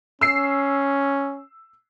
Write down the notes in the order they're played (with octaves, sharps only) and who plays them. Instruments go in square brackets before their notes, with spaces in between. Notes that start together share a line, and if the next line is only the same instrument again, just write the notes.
[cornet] C#4 [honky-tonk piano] E6 C7